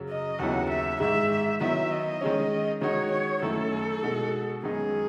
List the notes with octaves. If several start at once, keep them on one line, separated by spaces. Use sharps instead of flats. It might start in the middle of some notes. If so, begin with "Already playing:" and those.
Already playing: F#2 C#3 F#3
D#5
D#2 C#3 F#3 B3 E4 F#5
E5
G#2 D#3 G#3 E5
D#3 F#3 B3 E4 E5
D#5
D#3 G#3 C#4
D#3 G#3 D#4 F#4 C#5
C#5
F#2 D#3 A3 E4 A4
B2 G#3 D#4 F#4
F#2 D#3 G#3 B3 D#4 G#4